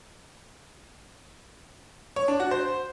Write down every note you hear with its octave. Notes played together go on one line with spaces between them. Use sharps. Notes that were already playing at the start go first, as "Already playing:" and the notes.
C#5
D4
F#4
C5